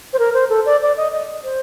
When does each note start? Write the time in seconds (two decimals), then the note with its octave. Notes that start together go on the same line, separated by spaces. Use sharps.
0.13 C5
0.19 A#4
0.34 C5
0.50 A4
0.66 D5
0.82 D5
0.97 D#5
1.12 D#5
1.44 C5